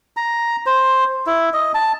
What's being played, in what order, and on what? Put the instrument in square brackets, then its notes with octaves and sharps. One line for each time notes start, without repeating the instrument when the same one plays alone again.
[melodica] A#5
C5
E4
D#5
A5